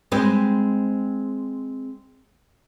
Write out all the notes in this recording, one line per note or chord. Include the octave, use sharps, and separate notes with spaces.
G#3 C4 B4